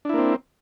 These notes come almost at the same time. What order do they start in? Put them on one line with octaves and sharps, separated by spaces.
D4 E4 A#3 C4